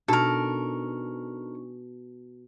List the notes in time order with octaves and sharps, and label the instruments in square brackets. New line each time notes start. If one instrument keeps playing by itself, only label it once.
[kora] B2 [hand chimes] D4 D#4 C#6 [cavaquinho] A4 A#4